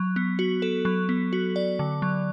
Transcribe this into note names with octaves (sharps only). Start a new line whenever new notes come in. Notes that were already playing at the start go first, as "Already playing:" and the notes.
Already playing: F#3
B3
F#4
A4
F#3
B3
F#4
D5
D3
F#3